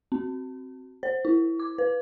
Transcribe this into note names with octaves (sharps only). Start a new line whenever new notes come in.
C4
C5
E4
D6
B4